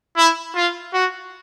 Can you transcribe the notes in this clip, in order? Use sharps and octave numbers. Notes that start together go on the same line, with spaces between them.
E4
F4
F#4